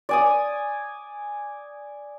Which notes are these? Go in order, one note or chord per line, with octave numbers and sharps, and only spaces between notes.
D5 G#5 D#6